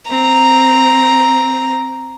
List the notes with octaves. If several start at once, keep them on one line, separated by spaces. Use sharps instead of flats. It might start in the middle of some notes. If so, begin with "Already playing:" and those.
C4 A#5